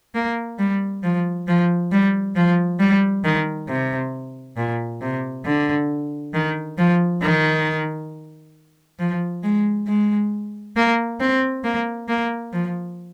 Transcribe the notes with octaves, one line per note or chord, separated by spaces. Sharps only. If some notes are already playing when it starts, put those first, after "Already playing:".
A#3
G3
F3
F3
G3
F3
G3
D#3
C3
A#2
C3
D3
D#3
F3
D#3
F3
G#3
G#3
A#3
C4
A#3
A#3
F3